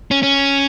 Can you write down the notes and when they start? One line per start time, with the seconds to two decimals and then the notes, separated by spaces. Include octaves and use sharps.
0.11 C#4
0.23 C#4